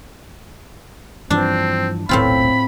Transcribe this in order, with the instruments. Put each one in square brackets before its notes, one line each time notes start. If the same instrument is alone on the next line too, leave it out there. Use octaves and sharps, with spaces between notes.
[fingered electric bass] G2 E3 F3 [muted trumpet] C4 [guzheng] D4
[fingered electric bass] D#1 B1 A3 [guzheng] A2 C4 F4 [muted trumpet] B5